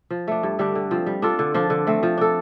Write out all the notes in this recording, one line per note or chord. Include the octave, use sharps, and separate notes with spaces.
F3
A3 D4
G2
D3 G3 D4
D3
F3 C4
G3
D4 F4 A4
D3
F3 D4 F4
D3
A3 C4
F3
D4 A4